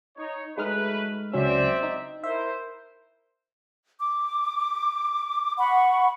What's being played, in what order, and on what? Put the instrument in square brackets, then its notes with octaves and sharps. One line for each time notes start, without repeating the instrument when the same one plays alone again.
[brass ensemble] D#4 C#5
[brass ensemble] F#3 A3 B4 [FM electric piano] G#3 D#4 F6
[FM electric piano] C#2 F#3 C#4 [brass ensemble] C4 D5 E5
[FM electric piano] D#4
[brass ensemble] E4 A#4 C5 [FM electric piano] E5
[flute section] D6
F#5 B5 C#6